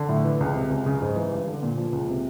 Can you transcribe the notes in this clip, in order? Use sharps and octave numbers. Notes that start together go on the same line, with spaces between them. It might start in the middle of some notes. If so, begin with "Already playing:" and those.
Already playing: D3
A2
E3
C#2
C3
C#2
C#3
G#2
E3
G2
D3
A#2
F3
C#2
C3